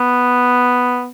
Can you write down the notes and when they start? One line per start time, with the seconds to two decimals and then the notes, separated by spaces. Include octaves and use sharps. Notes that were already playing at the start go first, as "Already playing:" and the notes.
Already playing: B3